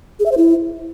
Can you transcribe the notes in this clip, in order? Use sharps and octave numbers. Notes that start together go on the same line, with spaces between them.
G#4
E5
C5
E4